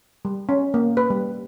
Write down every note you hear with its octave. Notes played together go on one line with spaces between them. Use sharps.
G3
C#4
A#3
B4
G3